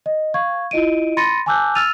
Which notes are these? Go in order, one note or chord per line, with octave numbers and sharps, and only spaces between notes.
D#5
F5 C#6 G#6
E4 F4 D#5 D7 D#7
B5 C6 A6 A#6 C#7 D#7
G#5 A5 D6 E6 F#6 G6
E6 F6 A6 D#7 F7